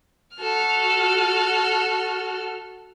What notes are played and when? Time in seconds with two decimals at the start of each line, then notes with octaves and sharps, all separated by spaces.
0.37 F#4 A4 F6